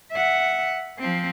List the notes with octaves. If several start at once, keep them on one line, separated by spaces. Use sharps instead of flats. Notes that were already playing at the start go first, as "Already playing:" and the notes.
E5 F#5
F3 C4